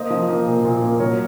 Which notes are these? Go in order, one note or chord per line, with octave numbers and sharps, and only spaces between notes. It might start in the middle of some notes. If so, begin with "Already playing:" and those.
Already playing: A#3 C5 D#5
F3
A#3
A#2
A#2
A#3
F#3 A#4 C#5